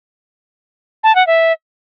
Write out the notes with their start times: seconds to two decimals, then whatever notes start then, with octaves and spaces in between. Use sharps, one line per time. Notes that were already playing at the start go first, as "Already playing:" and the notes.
1.04 A5
1.15 F#5
1.27 E5